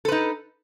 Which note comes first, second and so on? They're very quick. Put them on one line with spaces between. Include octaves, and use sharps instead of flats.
A4 B4 D#4